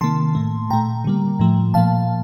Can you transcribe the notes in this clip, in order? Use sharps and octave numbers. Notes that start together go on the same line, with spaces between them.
C3 D#3 A#3 A5 C6
A2 A3
A#2 A3 G5 A#5
D3 G3 A#3
A2 F3 A3
A#2 F3 A#3 F5 A5